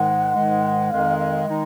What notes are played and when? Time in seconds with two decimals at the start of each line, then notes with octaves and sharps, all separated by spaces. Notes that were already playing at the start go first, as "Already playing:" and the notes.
Already playing: G#2 D#3 G#3 F#5
0.35 G#2 D#3 G#3
0.90 F2 D#3 G#3 D#4 F5
1.19 F5
1.45 D#3 G#3 D#4 D#5